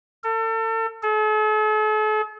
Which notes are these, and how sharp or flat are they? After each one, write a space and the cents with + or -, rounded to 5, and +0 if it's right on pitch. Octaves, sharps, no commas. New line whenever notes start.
A4 +35
A4 -45